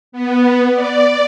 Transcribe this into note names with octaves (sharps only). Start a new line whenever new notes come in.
B3
D5